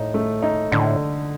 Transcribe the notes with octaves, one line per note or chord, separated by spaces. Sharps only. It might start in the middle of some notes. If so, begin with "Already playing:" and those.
Already playing: A2 D#4
A3
D#4
A2 D3